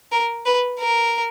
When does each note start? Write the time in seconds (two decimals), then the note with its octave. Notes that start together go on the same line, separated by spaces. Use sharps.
0.12 A#4
0.46 B4
0.80 A#4